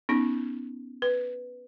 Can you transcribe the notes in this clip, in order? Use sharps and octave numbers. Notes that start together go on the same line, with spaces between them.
B3 C#4 D#4
B4